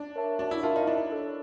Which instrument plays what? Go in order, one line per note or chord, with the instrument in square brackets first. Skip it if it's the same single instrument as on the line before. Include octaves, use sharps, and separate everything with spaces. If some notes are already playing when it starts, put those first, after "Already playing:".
Already playing: [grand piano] D4
[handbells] A#4 C#5 E5 A5
[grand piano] D4 [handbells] F#4
[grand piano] E4
[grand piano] F4 [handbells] A#4 C#5 E5 A5
[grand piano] D#4
[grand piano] D4 [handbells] E4
[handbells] A4 C#5